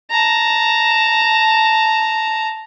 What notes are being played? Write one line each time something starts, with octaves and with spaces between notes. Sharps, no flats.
A5 A#5